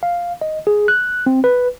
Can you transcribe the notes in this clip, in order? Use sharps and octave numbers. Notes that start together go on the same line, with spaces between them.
F5
D#5
G#4
F#6
C4
B4